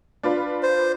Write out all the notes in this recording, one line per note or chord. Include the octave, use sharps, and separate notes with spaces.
D4 F4 B4
C5